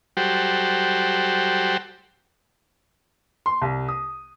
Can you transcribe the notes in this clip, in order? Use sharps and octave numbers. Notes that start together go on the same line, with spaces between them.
F#3 G3 F#4 G4 A4 C5
C6
C2
D#6